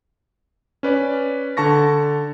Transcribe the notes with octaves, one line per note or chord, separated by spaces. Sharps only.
C#4 B4 D5
D3 A5 C#6 A#6